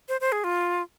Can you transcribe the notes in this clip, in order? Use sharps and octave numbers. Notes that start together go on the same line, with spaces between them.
C5
C5
G#4
F4